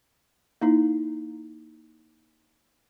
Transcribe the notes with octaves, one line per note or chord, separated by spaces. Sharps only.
A#3 D#4 E4